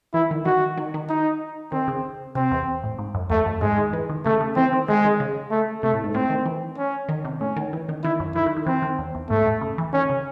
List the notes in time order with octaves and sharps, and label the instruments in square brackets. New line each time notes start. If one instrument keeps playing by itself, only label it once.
[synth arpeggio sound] E3 [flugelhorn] E4
[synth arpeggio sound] D#3
[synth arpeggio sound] D#3 [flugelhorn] F#4
[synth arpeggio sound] D#3
D#3
[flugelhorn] D#4
[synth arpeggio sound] D#3 [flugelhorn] C4
[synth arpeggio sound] C#3
[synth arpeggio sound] C3 [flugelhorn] C4
[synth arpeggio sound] E2
A2
G#2
F#2
[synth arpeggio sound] E2 [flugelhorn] A3
[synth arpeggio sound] F#2
[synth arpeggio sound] G#2 [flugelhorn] G#3
[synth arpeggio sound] D#3
E3
D#3
[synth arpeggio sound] C#3 [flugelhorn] A3
[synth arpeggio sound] C#3
[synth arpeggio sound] E3 [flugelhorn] C4
[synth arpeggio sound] D#3
[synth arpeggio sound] D#3 [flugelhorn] G#3
[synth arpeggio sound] D#3
C#3
[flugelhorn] A3
[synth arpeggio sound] C3 [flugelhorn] A3
[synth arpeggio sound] A2
G#2
[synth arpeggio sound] A2 [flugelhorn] C4
[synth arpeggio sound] D#3
E3
[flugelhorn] C#4
[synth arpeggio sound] D#3
C3
[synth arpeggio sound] A2 [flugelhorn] C#4
[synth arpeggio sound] D#3
E3
D#3
[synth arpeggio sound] D#3 [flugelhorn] E4
[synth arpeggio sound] F#2
[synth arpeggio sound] D#3 [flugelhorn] E4
[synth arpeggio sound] D#3
D#3
[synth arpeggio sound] E3 [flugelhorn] C4
[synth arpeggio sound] D#3
E2
E2
[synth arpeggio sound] G#2 [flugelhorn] A3
[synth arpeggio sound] A2
C#3
E3
[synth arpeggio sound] D#3 [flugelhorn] C#4
[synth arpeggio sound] C#3